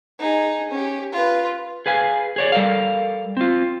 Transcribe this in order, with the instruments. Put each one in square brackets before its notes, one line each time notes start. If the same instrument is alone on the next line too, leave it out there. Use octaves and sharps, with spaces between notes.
[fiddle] D#4 G#4
C#4 G4
F4 B4
[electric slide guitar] G#4 B4 F5 G#5
G#4 C#5 D5
G3 A4 A#4 F5
C4 F4